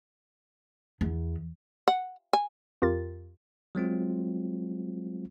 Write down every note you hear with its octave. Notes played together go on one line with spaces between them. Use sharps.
E2
F#5
G#5
F2 F4 G4 A#4 A6
F#3 G#3 C4 F4